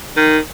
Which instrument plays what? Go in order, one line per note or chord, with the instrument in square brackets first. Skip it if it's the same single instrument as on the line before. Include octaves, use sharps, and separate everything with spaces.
[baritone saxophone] D#3